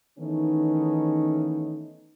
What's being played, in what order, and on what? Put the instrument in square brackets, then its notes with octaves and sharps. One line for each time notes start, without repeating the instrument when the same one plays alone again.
[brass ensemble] D#3 E3 A3 B3 C#4 D#4